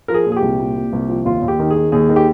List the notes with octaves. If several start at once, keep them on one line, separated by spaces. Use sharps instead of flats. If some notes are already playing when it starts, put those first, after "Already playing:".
F3 A#4
G#4
A#2
G#4
G4
C2
A#2
A#2
C2
F3
D#2 F4
D#2
G4
D#3
G#4
D#3
D#2 G#4
D#3
G4